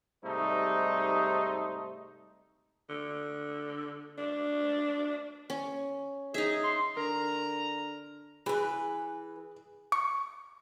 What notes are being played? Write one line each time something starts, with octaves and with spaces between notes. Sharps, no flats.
G#2 C3 G3 A3 D#4 C5
D3
D4
C#4
D#4 G#4 E5
C6
D3 A#4 A#5
E3 G#4 B4
C#6